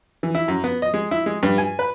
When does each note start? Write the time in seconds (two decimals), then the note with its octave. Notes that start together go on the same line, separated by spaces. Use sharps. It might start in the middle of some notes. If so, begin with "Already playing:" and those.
0.23 E3
0.35 E4
0.48 F#2
0.64 B3
0.82 D#5
0.94 G#3
1.11 E4
1.26 G#3
1.43 G2
1.58 G#5
1.79 B4